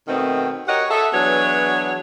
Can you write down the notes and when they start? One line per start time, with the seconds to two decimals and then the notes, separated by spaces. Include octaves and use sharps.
0.08 B2 D#3 A3 B3 C4
0.67 F#4 G4 A#4 C#5 D#5 F#5
0.90 G#4 A4 E5
1.13 E3 F#3 B3 D4 G#4 C#5